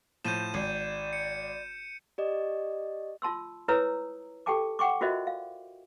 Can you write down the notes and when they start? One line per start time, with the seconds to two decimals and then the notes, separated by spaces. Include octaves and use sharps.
0.24 A2 F3 G6 D#7 E7
0.54 G#1 D5
1.13 C#7
2.18 G4 D5 D#5
3.22 F4 A5 C6 E6
3.68 E4 B4 C#5 A#5 D#6 E6
4.46 G4 A4 G5 A5 D6
4.79 F#5 G5 C#6 D6
5.01 F4 F#4 A#4 C5 D#5 E5
5.27 F5